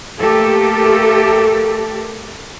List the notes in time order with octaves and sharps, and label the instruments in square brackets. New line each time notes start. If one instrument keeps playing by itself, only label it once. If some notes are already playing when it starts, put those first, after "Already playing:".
[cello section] A3 A#3 G4 A4